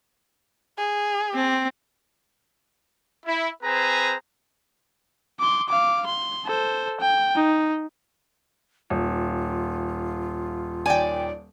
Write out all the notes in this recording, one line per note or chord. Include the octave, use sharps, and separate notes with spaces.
G#4
C4
E4
C4 G#4 B4 C5 G#5 A#5
C6 D6
F5 D6
C6
A4 C5
G5
D#4
D#1 F4
D#2 D5 G5 G#5